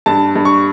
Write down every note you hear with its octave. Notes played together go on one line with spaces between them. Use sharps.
G2 A5
G2
C#6